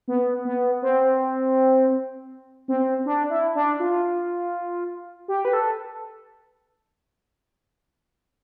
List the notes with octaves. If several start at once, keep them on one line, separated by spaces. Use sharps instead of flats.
B3
B3
C4
C4
D4
E4
D4
F4
G4
B4
A4